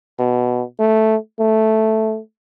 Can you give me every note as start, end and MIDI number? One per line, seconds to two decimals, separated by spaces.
0.18 0.62 47
0.79 1.16 57
1.39 2.19 57